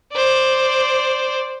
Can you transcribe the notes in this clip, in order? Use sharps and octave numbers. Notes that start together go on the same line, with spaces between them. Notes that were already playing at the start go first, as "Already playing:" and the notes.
C5 D5